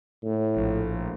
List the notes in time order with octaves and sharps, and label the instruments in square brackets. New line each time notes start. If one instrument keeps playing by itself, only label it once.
[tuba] A2
[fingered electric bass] A#1